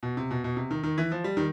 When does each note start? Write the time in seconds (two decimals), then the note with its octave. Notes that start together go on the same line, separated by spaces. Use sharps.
0.03 B2
0.17 C3
0.31 B2
0.44 B2
0.57 C3
0.71 D#3
0.83 D#3
0.98 E3
1.12 F3
1.24 G3
1.37 D#3